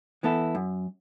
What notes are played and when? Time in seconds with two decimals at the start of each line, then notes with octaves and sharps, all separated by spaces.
0.23 E3 B3 E4 A4
0.55 F#2